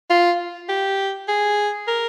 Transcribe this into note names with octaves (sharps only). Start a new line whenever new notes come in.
F4
G4
G#4
A#4